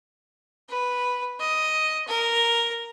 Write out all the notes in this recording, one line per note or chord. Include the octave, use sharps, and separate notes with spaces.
B4
D#5
A#4